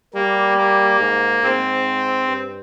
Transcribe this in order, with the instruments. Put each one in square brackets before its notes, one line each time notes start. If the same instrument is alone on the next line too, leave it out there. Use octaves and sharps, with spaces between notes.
[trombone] G3 [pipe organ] A#3
[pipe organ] A#3
[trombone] G#2
[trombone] G#2 [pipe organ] C4
[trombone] G2